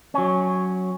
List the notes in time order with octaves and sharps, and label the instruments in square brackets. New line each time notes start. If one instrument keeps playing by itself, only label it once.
[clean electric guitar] F#3 C#4